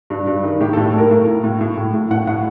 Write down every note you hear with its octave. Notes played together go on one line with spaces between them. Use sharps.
G2
G2
D#3
A2 G4
A4
A2
A4
A2 A#4
A2
A2
A2
A2
A2
A2
A2 F#5
A2 F#5